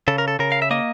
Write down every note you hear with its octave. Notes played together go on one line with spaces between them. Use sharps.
C#3 A4
A#4
A4
C#3 A#4
F5
E5
A#3 D#5